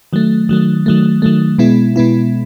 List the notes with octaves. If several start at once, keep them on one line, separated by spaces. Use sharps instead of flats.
D#3 F#3 A3
D#3 F#3 A3
D#3 F#3 A3
D#3 F#3 A3
B2 G#3 B3 E4
B2 G#3 B3 E4